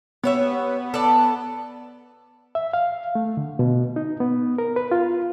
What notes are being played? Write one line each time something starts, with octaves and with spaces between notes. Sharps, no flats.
B3 G4 C#5 E5
A4 D5
E5
F5
A3
D3
B2
D#4
B3
A#4
B4
F4